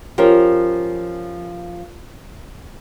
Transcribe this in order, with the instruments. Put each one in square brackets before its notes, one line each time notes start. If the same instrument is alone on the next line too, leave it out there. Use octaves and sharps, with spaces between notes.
[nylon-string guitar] F3 C#4 G4 A#4